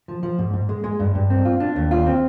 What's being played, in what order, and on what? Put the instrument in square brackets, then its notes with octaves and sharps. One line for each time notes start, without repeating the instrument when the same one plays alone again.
[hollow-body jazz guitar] F3
F3
G#2
G#2
G#3
G#3
G2
G2
C4
F4
D4
D#2
F4
C4